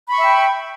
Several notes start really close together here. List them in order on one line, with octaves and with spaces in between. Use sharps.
B5 C#6 E5 G5